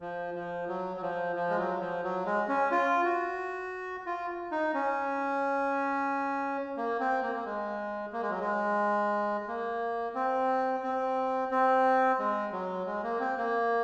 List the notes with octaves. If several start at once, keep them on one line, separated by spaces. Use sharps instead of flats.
F3
F3
F#3
F#3
F3
F3
G#3
F#3
F3
F#3
G#3
C#4
F4
F#4
F4
D#4
C#4
A#3
C4
A#3
A#3
G#3
A#3
G#3
F#3
G#3
A#3
C4
C4
C4
G#3
F#3
G#3
A#3
C4
A#3